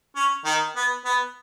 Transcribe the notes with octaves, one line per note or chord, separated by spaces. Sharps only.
C#4
D#3 D#4
B3
B3